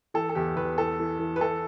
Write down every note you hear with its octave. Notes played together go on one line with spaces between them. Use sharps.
E3 A4
A4
E2 G4
E2 B4
E3 A4
E3
E3
B4
E3 A4